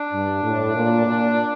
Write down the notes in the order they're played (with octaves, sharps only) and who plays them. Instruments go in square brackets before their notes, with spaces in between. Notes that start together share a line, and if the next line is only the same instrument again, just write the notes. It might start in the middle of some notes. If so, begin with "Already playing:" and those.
Already playing: [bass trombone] D4
[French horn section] G2
A2
A#2
A#2